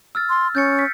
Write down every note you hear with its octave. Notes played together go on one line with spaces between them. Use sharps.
E6 F6 A6
C6
C#4 G6 A6 C#7
B6